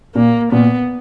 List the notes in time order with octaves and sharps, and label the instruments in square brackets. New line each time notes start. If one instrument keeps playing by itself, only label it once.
[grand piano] A#2 [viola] A#3
[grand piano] A#2 [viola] B3